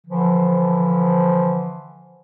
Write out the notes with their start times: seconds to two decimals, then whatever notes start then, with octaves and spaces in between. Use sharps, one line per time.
0.07 D3 E3 F3